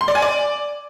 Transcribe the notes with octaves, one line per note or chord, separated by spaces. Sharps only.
C6
D5
G#5
D5